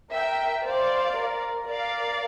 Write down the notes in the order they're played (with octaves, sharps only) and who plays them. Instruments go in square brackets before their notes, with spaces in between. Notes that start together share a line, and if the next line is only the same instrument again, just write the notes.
[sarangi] A#4 [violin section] E5 G5
[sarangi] C5 [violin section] D5 F5
[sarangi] A#4
[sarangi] A#4 [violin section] D5 F5